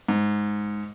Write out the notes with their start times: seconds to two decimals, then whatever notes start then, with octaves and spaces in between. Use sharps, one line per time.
0.09 G#2